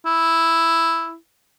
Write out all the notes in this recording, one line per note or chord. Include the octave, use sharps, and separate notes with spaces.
E4